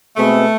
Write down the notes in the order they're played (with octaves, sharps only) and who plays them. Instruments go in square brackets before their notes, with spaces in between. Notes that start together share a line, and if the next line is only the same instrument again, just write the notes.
[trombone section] B2 G#3 C4 G#4 B4 [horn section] A3